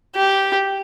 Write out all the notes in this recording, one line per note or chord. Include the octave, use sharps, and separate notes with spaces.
G4